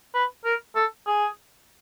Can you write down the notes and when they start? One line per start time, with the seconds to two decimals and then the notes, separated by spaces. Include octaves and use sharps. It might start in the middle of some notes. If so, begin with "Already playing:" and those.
0.14 B4
0.45 A#4
0.76 A4
1.07 G#4